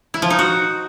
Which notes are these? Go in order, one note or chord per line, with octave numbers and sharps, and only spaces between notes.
E4
F3
D#4
F#4